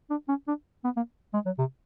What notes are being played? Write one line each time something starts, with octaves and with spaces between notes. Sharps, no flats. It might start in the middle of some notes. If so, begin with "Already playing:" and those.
D4
C#4
D4
B3
A#3
G#3
F#3
C3